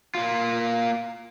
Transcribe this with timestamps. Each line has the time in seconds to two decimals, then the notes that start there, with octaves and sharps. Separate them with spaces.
0.15 A#3 F4